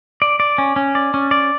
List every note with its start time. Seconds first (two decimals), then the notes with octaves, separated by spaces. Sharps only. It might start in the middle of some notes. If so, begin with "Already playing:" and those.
0.22 D5
0.40 D5
0.58 C#4
0.76 C#4
0.95 D5
1.14 C#4
1.31 D5